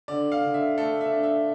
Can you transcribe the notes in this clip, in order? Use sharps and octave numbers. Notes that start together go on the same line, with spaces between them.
D3 D5
F5
D3
E5
A3 A4
E5
D4
E5